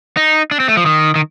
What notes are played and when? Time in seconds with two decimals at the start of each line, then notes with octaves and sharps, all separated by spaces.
0.17 D#4
0.51 D4
0.60 C4
0.68 A3
0.77 F3
0.86 D#3
1.16 D#3